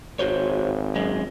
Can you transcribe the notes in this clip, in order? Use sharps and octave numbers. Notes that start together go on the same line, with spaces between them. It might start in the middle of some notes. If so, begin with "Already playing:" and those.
G#1 F#4 C5 C#5
F#2 G#3